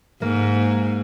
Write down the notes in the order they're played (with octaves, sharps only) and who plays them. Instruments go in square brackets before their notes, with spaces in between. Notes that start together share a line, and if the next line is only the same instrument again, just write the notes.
[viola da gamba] G#2 [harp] A#3